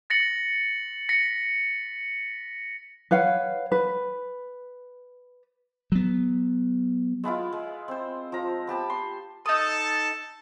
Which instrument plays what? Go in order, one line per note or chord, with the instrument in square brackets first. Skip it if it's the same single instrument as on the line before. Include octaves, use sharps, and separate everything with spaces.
[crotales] A6 A#6 C#7 F#7
A#6 B6 C#7
[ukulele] B4 C#5 F5 F#5
B4
[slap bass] F#3 B3
[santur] G#3 B3 E4 F4
G#3
C4 C5
F3 A#5
B3 G4 A5 B5
C6
[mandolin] D#4 D#6 [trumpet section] A4 A5